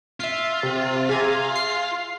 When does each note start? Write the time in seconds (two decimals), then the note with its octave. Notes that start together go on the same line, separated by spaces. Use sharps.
0.20 F4 E5 C7
0.63 C3
1.09 G#4 E5 F5 G#5 A#5
1.55 C7